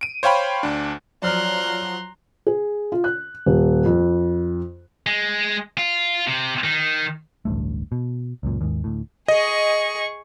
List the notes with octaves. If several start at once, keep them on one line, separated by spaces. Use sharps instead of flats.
D7 D#7
C5 C#5 F5 G5 B5
D2 D4
F3 F#3 D5 A#5 C6 F6 F#6
G#4
F4
F#6
D#1
F2
G#3
F4
C3
D#3
D1 A1 G2 A3
B2
C#2 F#2 A#2
D#2 G#2
D2 A2
G#4 D#5 C#6